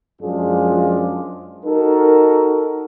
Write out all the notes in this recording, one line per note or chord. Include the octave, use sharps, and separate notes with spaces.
F#2 F3 G#3 D4 F4 G#4
D#4 F#4 A4 A#4